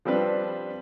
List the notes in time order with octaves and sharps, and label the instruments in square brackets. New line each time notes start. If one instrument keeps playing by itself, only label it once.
[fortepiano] F3 G3 C4 D4 B4